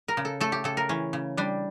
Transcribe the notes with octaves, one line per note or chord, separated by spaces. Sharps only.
A#4
C#3
A4
A3 A4
G4
C#3 A4
A#4
E3 C#4
C#3
G3 D4